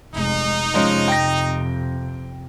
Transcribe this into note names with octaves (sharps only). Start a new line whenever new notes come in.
F1 G#3 D#4
F2 C3 F3 G#3 C#4
G5 A#6